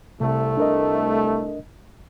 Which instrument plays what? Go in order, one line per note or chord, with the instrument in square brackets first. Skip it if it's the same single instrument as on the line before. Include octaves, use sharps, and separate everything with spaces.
[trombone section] C2 A3 [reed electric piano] C3
[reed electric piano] D4 A#4 D#5